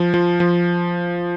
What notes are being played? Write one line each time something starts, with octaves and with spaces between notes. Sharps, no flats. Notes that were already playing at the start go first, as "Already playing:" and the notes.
Already playing: F3
F3
F3